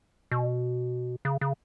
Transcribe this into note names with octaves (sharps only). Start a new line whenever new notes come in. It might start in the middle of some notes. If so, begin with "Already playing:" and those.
B2
C#3
C#3